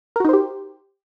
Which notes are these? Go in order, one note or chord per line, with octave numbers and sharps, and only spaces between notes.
D#4 F#4 G4 A#4 C5